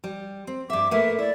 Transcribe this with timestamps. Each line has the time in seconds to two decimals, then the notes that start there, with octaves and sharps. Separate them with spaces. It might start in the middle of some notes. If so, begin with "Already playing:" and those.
0.04 G3
0.47 C4
0.70 G2 E5 D6
0.91 A3 A#3 B4 E5
1.19 E4 D5